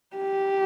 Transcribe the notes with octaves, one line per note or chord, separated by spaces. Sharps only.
G4